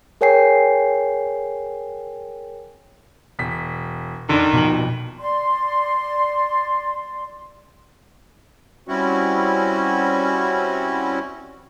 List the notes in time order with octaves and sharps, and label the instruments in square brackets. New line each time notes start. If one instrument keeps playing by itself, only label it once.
[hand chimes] G#4 A#4 C#5 G5 G#5 C7
[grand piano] E1 B6
[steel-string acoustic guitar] F2 [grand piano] D3 D4 [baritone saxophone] D#3
[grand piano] D#1 F2 F#7 [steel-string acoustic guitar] B2
[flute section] D5 C6
[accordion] G3 C4 C#4 E4 F#4